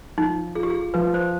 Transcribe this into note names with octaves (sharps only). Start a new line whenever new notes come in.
F3 D#4
F4 G#4
G4
G#4
F3 B4
C5